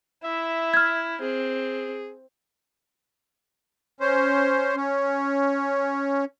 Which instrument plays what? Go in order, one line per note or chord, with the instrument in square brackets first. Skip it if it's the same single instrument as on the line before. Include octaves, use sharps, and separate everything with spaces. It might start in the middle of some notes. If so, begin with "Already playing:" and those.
[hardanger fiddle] E4 [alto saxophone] E5
[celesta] F6 G#6
[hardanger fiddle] C4 [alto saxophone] G#4
[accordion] C#4 C5
C#4